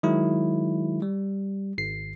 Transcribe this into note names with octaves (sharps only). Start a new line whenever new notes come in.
D#3 F#3 G#3 E4
G3
G#1 C7